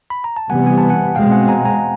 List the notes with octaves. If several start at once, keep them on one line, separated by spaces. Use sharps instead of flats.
B5
A#5
A5
C3 E3 G3 B3 F#5 G#5
G#5
A5
F#5 G#5
B2 G#3 C4 F5 G5
F#5 G#5
G#5 A#5
G#5 A#5